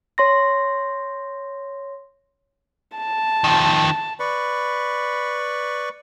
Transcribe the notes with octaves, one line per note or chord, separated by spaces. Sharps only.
C#5 C6 A#6
A5
D#3 F3
B4 D5 B5 C#6